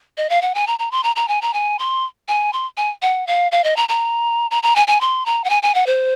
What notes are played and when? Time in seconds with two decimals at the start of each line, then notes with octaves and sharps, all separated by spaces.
0.17 D#5
0.30 F5
0.42 F#5
0.55 G#5
0.67 A#5
0.79 A#5
0.92 C6
1.03 A#5
1.16 A#5
1.28 G#5
1.42 A#5
1.54 G#5
1.79 C6
2.28 G#5
2.53 C6
2.77 G#5
3.02 F#5
3.27 F5
3.52 F5
3.64 D#5
3.76 A#5
3.89 A#5
4.51 A#5
4.63 A#5
4.76 G#5
4.87 G#5
5.01 C6
5.26 A#5
5.44 F#5
5.50 G#5
5.63 G#5
5.75 F#5
5.87 C5